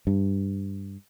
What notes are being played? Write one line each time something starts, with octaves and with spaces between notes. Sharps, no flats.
G2